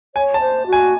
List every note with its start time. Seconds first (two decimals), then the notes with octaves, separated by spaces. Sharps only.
0.15 C#5 G#5
0.34 A5
0.40 C5
0.67 F#4
0.73 G#5